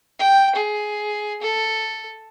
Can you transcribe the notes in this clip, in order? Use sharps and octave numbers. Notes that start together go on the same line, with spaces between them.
G5
G#4
A4